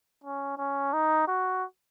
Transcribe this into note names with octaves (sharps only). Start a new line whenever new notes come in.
C#4
C#4
D#4
F#4